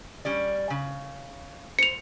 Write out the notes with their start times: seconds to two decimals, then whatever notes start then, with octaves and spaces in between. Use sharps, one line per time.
0.25 G3 C#4 D5
0.70 C#3
1.79 C5 C#7 F7